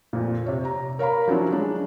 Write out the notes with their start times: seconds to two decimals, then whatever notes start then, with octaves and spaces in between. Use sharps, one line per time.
0.13 F2 A#2
0.46 C3 C#5
0.65 A#5
0.99 A#4 C#5 F5 A#5 B5
1.27 F3 F#3 C#4 D4 E4
1.51 G#3 D4